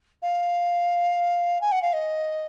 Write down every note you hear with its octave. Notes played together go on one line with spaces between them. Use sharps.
F5
G#5
F#5
F5
D#5